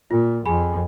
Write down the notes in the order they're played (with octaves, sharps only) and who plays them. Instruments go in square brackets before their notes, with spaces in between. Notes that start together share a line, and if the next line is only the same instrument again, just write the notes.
[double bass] A#2 [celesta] F4
[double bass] F2 [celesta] G#4 G#5 B5